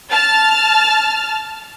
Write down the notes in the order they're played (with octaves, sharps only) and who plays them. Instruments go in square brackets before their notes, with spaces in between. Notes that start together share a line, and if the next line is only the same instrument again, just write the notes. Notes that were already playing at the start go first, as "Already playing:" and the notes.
[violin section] A5 F6 A6